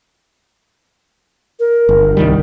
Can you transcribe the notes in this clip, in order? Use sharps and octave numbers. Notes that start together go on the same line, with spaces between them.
A#4
G1
C2 D#3 G3